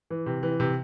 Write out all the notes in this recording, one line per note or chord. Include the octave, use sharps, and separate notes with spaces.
E3
C3
E3
C3